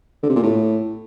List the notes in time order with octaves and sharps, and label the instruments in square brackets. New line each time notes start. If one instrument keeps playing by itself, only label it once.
[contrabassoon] D3
C3
A#2
A2